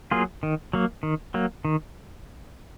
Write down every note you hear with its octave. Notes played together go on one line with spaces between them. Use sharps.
F#3 A#3 F4 G#4
D#3
F#3 A#3
D#3
F#3 A#3
D#3